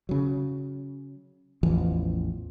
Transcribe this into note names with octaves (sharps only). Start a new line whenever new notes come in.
C#3 F#3
A1 E2 E3 F3